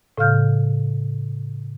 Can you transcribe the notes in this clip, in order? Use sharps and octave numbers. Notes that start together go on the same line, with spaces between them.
A2 C#3 F5 F6 G6